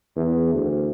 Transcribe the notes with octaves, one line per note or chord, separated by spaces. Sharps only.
E2
D2